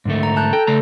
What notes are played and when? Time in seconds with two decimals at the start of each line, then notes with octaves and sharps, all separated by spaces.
0.05 G#2 D3 A3
0.23 A#5
0.36 A5 F#6 G6
0.53 A4 G5
0.67 C#3 A3 A#5